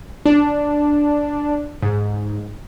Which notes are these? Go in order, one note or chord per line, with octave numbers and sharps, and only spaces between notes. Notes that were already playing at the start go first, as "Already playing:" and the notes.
D4
G#2